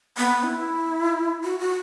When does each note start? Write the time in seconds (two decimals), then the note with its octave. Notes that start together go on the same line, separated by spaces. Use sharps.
0.18 B3
0.43 E4
1.44 F#4
1.60 F#4